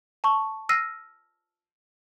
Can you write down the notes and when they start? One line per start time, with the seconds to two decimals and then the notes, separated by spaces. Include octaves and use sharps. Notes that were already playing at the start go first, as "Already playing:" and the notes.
0.24 A5 C#6
0.69 E6 F6 A#6 C7 D#7